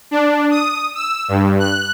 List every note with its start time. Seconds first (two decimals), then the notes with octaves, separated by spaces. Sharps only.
0.11 D4
0.51 D#6
0.95 E6
1.28 G2
1.59 F#6